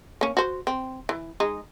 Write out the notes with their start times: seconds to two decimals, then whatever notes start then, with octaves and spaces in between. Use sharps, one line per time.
0.21 A#3 C#4
0.37 F#4 C5
0.67 C4
1.09 E3
1.40 G#3 D#4